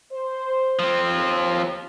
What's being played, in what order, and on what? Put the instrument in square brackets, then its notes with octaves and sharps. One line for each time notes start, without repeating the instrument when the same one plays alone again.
[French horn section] C5
[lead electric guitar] F3 C4
[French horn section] D#2